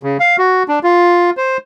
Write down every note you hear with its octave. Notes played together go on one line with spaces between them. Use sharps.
C#3
F5
F#4
D4
F4
C5